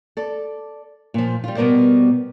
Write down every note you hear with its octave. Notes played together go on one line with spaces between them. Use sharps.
A4 D5
A#2 F3
G3 F4
B2 G3 B3 A#4 C5 D5